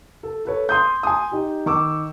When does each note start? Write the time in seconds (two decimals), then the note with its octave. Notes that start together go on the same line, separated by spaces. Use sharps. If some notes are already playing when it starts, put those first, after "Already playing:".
0.23 A4
0.45 A4 B4 C#5
0.69 C6 D#6 G6
1.03 G#5 C6 D#6
1.32 D#4 G4
1.66 D#3 C#6 D6 E6